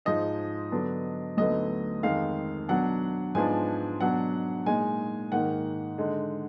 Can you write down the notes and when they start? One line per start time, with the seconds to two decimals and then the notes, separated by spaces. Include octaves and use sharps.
0.05 G#2 F3 G#3 D#4 D#5
0.72 D3 F#3 B3 D4
1.37 D2 D3 F#3 B3 D#4 D#5
2.03 F2 D#3 G#3 F5
2.68 B2 F#3 D4 F#5
3.35 G#2 F3 G#3 B3 D4 G#5
4.01 B2 F#3 D4 F#5
4.66 A#2 G#3 D#4 G#5
5.32 G#2 D#3 A#3 F#5
5.98 D3 G#3 D#4